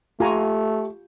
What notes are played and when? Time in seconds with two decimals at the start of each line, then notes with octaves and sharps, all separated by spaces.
0.20 A3 F4 G4 G#5 A#5 C#6